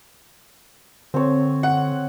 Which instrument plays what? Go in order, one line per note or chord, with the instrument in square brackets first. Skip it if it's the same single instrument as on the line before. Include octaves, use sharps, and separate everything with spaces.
[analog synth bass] D3 [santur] C4 C#5
[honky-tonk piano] F#5